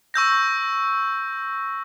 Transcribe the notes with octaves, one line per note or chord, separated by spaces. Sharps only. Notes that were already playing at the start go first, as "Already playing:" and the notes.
C#6 E6 G6 A#6